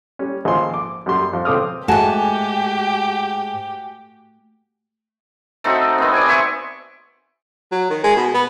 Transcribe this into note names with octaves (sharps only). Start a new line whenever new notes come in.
G3 C#4
G#1 F3 G#5 C6
D6
F#2 G3 C6
F2
C#2 C4 A4 D6 D#6 F6
G#2 A3 F#4 G4 G#5 A5
A3 C4 D#4 F#4
D#3 B3 C4
D5 D#5 G#5
C5 E5 G#5 C#6
F#3
D#3
G#3
B2
B3